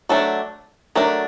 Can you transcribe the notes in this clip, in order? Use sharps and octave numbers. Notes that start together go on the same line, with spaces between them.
F#3 A3 D4 A4
F#3 A3 D4 A#4